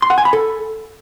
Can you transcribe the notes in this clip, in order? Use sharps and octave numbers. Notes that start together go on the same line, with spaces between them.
C6
F#5
G#5
B5
A4